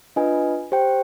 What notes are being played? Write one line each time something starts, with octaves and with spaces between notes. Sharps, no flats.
D4 F4 B4 D#5 G#5
G4 C5 G5